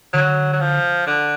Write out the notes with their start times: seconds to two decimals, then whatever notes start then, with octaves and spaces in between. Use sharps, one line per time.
0.13 D3 F#3
0.53 F#3
0.60 F3
1.07 D3